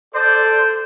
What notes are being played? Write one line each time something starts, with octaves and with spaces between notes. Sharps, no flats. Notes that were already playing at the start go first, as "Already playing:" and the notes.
A4 C5 D5